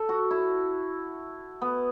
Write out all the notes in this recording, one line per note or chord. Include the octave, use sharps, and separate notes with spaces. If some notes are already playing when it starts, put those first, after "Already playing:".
Already playing: A4
F#4
E4
B3